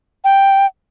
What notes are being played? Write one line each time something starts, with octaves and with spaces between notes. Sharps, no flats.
G5